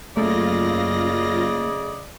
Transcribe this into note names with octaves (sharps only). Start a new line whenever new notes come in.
F#2 C#3 A3 A#3 F4 D5 D#5 A#6